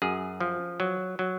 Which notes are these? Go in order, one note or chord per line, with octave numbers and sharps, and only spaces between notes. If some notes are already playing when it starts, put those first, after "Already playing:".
F#2 G#4
F3
F#3
F#3